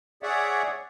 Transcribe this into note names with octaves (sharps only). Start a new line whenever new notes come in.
G#4 C#5 D5 E5 F#5